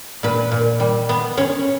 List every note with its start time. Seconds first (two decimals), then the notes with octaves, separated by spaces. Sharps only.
0.23 A#2 B4
0.52 A#2
0.80 G3
1.09 B3
1.37 C#4 C#5